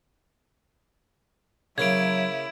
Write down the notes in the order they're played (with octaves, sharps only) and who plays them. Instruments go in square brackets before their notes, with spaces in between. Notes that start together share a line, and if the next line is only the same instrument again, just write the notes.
[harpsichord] C#3 A#3 [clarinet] F#3 [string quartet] E4 [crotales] G#6 D7